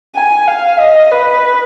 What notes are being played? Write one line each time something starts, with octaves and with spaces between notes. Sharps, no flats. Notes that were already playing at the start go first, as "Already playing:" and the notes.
G#5
F5
D#5
B4